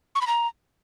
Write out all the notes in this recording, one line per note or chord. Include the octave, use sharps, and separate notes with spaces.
C#6
B5
A#5